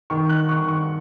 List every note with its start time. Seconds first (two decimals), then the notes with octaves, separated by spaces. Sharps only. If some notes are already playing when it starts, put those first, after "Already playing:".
0.10 D#3 C#6
0.29 F#6
0.49 D#3 C#6
0.68 C#6